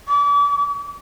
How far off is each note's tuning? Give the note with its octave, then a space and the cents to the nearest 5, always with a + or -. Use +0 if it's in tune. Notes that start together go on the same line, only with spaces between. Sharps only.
D6 -35